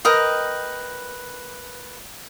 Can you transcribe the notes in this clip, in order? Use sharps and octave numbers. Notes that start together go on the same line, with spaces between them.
A#4 B4 D#5 G5